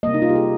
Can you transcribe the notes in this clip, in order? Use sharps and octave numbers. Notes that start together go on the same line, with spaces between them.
C3 G3 A#3 D#5
D#4
F4
G4
G#4